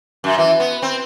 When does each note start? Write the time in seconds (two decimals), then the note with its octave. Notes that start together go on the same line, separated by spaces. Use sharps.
0.24 F#2
0.38 E3
0.60 B3
0.82 C4